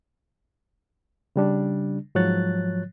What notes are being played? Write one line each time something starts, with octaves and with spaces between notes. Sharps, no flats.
C#3 G3 D4
G#2 F3 F#3 C#5 F#6 A6